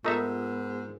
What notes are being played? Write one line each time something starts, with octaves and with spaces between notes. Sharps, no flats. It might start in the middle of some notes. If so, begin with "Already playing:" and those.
G#2 A3 B3 D#4 F4 A#4 E5 E6